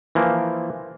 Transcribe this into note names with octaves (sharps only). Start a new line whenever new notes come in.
E3 F3 A#3